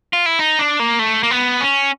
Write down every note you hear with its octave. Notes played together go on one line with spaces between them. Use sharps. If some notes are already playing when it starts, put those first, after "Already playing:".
F4
E4
D#4
D4
A#3
A3
A#3
B3
C#4